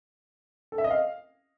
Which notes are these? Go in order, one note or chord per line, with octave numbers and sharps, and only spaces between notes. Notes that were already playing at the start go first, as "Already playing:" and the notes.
A4
E5
D#5
F5